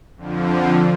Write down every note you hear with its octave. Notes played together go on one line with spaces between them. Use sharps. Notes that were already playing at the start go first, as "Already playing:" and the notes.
F2 D3 F3